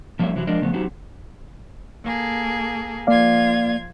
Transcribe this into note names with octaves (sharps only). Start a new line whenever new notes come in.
F3 G3 A#3 C#4 C#5 E5
C3 E3 F#3 E4
F3 G#3 D4 A#4 D5 D#5
C#3 F3 A3 B3
F#3 C4 C#4 D#4 F#4 G4
A#3 G#4 A4
F3 A#3 F4 D5 F5 G#6